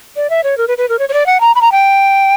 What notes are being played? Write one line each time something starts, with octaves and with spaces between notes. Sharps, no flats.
D5
E5
C#5
A#4
B4
B4
A#4
C#5
C#5
D5
F#5
A#5
B5
A#5
G5